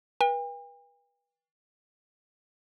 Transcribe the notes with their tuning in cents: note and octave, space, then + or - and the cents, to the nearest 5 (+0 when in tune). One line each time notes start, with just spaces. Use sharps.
B4 -35 G5 +45